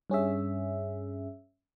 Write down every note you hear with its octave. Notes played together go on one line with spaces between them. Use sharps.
G2 C#4 G#4 E5